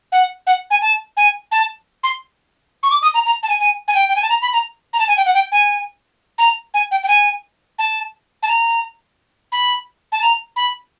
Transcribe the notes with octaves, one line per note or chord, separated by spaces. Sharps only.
F#5
F#5
G#5
A5
G#5
A5
C6
C#6
D6
D#6
A#5
A#5
A5
G#5
G#5
G#5
G5
G5
G#5
A5
A#5
B5
A#5
A#5
A5
G#5
G5
F#5
G5
G#5
A#5
G#5
G5
G5
G#5
A5
A5
A#5
B5
A5
A#5
B5